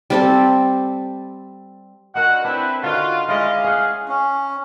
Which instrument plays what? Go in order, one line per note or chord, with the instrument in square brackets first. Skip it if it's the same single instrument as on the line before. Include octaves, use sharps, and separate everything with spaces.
[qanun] G3 C4 A4
[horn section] D3 F#4 [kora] D#4 A#4 [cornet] F#5
[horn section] C4 E4 [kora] D4 [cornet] B4
[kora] D3 D#3 [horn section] F4 [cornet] F#4
[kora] G#3 E4 [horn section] C#4 D5 D#5 [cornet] F5
[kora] C#4 F#5 [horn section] G#4
[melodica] C#4